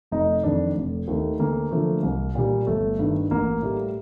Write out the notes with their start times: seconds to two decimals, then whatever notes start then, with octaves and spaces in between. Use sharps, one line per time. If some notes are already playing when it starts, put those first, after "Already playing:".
0.11 F1 D#4
0.43 F2 D#3 D4
0.76 F1
1.07 D#2 D#3 A3
1.39 D2 A#3
1.71 D3 F3 A3
2.03 C2
2.35 A#2 G3
2.67 G1 A3
2.99 G2 D#3
3.31 A1 A#3
3.62 A2 G3